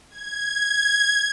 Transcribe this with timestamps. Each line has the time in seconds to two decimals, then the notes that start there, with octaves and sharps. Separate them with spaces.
0.10 G#6